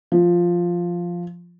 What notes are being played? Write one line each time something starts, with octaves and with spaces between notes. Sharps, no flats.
F3